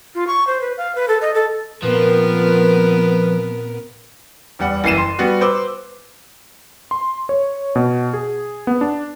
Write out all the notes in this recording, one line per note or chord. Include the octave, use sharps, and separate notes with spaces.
F4
C#6
C5
B4
F5
B4
A4
D#5
A4
A#2 F3 B3 C4 A#4 B4
E2 G3 F#5
F#1 E3 C7 D#7 E7
C6
G3 B3 F#4
B4 C5 D6 E6
C6
C#5
B2
G#4
B3
D4